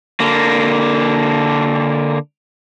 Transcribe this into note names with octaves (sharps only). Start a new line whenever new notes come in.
D3 A#3